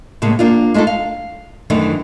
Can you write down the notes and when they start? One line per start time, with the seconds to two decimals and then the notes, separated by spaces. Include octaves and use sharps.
0.22 A2 C#3 G#3 A#3
0.39 A#3 D4 F4
0.74 G#3 A3 D#4 F4 A4
0.87 F5
1.70 F#2 D#3 E3 A3 D4